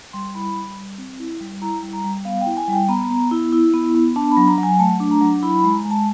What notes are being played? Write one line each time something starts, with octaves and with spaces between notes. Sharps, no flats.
G3 C6
E4 B5
G3
G3
C4
E4
G3
E4 A#5
G3
A#5
G3
B3 F5
G5
E4
G#5
G3
G5
B3 A#5
B3
E4
E4
B3
B3
D4 A5
B5
F#3
A#5
F#3
G#5
A3 A5
D4
A#5
F#3
E4 B5
B5
G#3
A#5
G#3
A5